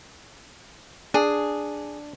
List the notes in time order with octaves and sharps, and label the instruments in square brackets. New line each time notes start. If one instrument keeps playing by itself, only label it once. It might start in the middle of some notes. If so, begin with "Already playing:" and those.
[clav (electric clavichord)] D4 [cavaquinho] G#4